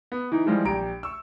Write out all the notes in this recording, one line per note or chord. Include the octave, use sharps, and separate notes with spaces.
B3
E3 D#4
E3 F3 G3 G#3 F4
A#1 G4 A#5 D7
C#6 E6